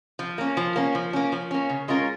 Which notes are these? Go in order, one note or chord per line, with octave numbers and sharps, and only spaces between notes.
F3
A#3 C#4
F3
A#3 C#4
F3
A#3 C#4
F3
A#3 C#4
C#3
G#3 C#4 F4 A#4